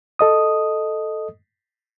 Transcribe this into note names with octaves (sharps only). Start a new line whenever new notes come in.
A4 D#5 D#6